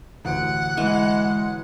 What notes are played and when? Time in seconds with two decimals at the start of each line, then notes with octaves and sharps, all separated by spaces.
0.25 A1 D2 F#5 D7
0.77 E3 G#3